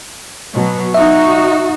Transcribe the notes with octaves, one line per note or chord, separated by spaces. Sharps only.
B2 F#3
D#4 F#4 E5